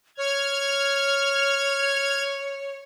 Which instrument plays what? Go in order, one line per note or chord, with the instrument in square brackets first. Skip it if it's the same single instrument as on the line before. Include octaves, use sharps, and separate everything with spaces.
[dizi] C#5 [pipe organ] F6 G#6